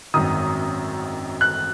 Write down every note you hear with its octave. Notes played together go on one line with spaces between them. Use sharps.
G#1 F#2 D#3 D#6
F#6